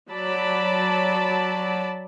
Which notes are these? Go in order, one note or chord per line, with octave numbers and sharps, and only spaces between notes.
F#3 D5 A5 B5